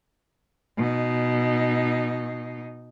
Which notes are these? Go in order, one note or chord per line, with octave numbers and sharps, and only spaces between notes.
B2 D#4